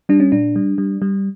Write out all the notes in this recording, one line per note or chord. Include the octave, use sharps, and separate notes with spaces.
G3 D4
C#4
A#2 D4
G3
G3
G3